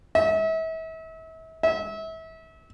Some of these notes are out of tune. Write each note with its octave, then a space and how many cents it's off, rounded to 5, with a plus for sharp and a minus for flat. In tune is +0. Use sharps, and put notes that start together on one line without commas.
E5 -35
E5 -30